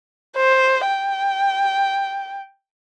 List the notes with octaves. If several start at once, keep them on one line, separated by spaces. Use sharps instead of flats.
C5
G5